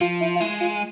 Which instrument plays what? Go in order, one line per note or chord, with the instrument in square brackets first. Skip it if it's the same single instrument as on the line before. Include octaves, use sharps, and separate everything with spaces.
[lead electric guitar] F3 [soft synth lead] F4
[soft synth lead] E4
F4
[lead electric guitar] G#3 [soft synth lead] E4
[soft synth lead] F4